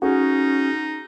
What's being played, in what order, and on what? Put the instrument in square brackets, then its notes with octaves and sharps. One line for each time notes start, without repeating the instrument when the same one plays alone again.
[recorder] C#4 [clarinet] D#4 [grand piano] F#4 G#4